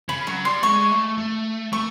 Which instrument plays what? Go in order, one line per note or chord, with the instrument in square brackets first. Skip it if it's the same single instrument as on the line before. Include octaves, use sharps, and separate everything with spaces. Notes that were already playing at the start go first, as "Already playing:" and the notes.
[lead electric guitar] C#3 [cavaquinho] B5
[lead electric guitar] F#3 [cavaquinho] C#6
[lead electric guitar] G3 [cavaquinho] C6
[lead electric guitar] G#3 [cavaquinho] C#6
[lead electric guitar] A3
A3
[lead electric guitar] A3 [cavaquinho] C#6